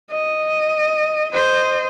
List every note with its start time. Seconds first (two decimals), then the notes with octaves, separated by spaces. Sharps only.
0.11 D#5
1.32 C5 D#5